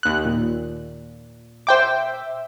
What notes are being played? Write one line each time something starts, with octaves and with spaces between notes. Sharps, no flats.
D#2 F#6
A#2
C5 E5 G5 D6